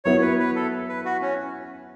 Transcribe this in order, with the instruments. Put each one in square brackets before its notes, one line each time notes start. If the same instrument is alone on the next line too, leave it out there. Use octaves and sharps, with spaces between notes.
[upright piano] F#3 B3 E4 [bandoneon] C#5
[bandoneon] B4
B4
A4
B4
F#4
C#4